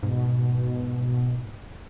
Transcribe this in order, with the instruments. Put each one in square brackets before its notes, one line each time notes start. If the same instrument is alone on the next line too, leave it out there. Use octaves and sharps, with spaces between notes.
[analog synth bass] G#2 [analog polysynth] B2